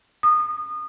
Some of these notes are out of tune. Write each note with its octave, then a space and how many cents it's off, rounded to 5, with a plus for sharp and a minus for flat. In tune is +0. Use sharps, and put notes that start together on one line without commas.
D#6 -25